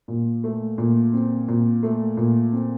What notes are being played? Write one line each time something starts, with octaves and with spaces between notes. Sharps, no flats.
A#2
A3
A#2
C4
A#2
A3
A#2
C4